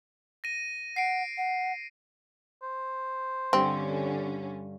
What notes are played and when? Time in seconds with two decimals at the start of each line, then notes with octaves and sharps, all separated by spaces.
0.44 A#6 D#7
0.96 F#5 C7 D7
1.38 F#5
2.62 C5
3.53 G2 D3 C4 C#4